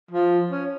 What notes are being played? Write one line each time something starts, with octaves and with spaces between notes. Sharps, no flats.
F3
C#4